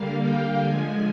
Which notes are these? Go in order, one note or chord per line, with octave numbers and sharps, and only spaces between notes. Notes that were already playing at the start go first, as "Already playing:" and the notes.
Already playing: D3 G3 A#3 F5
G5
D3 F3 G#3 G#5